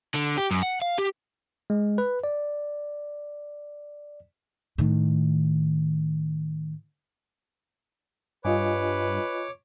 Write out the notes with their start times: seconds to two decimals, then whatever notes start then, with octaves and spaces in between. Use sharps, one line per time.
0.15 D3
0.37 G4
0.51 F#2
0.63 F#5
0.82 F5
0.98 G4
1.70 G#3
1.98 B4
2.24 D5
4.78 A2 D#3
8.45 G2 F4 B4 C#5 D#5 G#5 D6